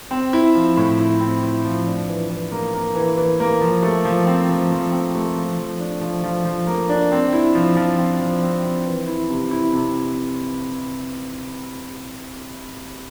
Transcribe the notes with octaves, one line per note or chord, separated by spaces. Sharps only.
C4
E4
F3
A2
E4
C4
E4
F3
D4
E3
E3
A#3
A#3
E3
E3
A#3
F3
A3
F3
C4
F3
F3
C4
A3
F3
F3
D4
F3
F3
F3
A#3
D4
C4
E4
F3
F3
C4
F3
C4
C4
E3
E4
C3
E4
C3